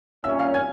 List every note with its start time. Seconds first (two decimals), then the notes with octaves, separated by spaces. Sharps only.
0.24 A#2 G3 C#4 E5 E6
0.39 F5 F6
0.54 G#5 G#6